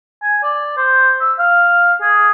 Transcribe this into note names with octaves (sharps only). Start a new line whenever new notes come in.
G#5
D5
C5
E6
F5
G#4